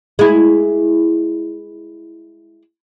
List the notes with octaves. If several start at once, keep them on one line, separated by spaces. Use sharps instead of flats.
G#3 E4